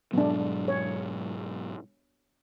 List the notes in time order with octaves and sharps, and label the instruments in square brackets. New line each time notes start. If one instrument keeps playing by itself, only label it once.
[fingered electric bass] G#2 B2 F#3 [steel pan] B3 D4
[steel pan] C#5